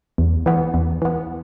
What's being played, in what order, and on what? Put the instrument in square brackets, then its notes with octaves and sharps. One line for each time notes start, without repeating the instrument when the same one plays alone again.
[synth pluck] E2
E3 B3
E2
E3 B3